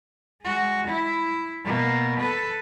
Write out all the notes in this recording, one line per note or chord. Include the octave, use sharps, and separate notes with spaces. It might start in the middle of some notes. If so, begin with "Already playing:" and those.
G#3 F#4
E4
B2 A#3
A4 B4